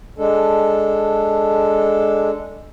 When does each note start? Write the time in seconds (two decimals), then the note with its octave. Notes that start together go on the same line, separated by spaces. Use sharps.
0.18 G#3 D4 A4